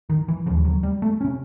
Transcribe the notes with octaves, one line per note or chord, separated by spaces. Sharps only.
D#3
E3
D#2 C#3 F3
F#3
G3
A3
C3 C#4